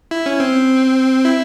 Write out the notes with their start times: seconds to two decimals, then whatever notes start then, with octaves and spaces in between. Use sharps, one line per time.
0.11 E4
0.26 C#4
0.40 C4
1.25 E4